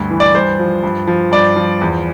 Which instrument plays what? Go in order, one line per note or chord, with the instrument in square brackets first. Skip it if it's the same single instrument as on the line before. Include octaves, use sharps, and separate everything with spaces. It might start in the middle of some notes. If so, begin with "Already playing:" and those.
Already playing: [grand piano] D2 G2
E3
D5
G2 C5
F3
G2
F3
G2 D5
F3
E2